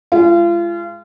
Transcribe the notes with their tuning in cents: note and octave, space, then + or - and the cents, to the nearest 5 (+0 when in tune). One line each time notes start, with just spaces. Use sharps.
G#3 +0 F4 -35